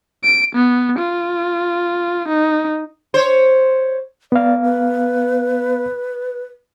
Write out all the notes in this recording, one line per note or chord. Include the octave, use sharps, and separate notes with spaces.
D7
B3
F4
D#4
C5 C#5
B3 D5 F5
B4